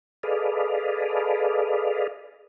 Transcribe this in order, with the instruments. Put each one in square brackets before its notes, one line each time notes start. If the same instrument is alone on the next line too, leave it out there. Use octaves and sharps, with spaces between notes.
[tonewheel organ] G#4 A4 B4 D5 D#5 F5